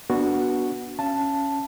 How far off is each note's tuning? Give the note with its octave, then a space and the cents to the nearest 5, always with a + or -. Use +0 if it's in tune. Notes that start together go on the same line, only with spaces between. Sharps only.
B3 -20 D4 +0 F#4 +0
C#4 +0 F5 -35 A5 +0